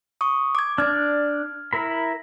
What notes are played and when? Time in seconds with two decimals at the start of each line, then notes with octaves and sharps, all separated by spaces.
0.21 C#6 D#6
0.55 D6 G#6
0.78 D4 D5 F6 G#6
1.73 E4 A#4 B5